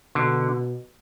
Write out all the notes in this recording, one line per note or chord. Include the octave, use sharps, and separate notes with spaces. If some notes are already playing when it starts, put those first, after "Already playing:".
B2 D3